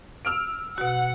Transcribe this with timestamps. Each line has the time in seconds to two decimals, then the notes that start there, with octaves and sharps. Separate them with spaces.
0.25 E6 F6 D7
0.78 B2 F#4 F#5